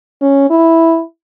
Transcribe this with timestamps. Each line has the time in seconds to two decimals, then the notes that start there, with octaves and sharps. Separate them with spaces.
0.22 C#4
0.50 E4